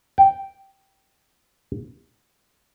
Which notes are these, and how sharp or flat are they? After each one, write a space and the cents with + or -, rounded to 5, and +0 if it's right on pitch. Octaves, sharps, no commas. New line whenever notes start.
G5 -10